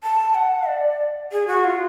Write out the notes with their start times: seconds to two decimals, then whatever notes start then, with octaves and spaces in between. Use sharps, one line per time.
0.03 A5
0.35 F#5
0.67 D5
1.32 G#4
1.47 F#4
1.64 F4